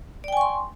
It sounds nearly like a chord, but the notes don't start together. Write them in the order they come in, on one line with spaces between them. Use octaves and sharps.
D5 G5 G#5 C#6 C6